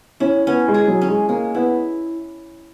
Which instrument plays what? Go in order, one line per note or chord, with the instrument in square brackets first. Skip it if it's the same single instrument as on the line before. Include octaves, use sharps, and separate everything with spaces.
[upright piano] C#4 [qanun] E4
[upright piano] B3 [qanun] C#4
[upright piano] G#3
[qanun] G#4
[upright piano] F#3
[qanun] C#4
[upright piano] G#3
[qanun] G#3 [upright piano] A#3
[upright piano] B3 [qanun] E4